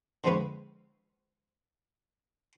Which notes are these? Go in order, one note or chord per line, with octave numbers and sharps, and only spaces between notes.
D3 F3 G#3 C4 C#4 B4